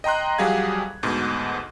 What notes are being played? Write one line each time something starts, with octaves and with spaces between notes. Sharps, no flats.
D#5 G5 A#5 C6 F#6
F2 F#3 G3 G#4 F5 G#6
D2 G#2 B2